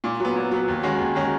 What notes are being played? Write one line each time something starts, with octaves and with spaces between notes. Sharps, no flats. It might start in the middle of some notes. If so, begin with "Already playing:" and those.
A#2
F#3 B3
A#2
F#3 B3
D#2
D#3 G#3 C#4 F#4
D#2
D#3 G#3 C#4 F#4